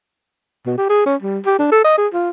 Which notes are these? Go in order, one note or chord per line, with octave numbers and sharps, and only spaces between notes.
B2
G4
G#4
C#4
G3
G4
D4
A4
D#5
G#4
F4